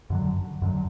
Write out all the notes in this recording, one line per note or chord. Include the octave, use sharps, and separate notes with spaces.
F#2 D3 F#3
F#2 D3 F#3